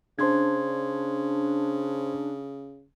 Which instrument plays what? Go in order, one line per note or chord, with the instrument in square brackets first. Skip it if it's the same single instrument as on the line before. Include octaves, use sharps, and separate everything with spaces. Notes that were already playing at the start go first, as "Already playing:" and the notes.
[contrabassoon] C#3 [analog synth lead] D4 [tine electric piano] C5 C6 G#6